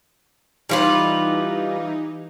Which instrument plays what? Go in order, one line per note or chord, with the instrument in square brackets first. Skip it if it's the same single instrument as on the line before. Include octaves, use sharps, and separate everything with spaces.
[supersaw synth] E3 D#4 [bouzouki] G3 F4 B4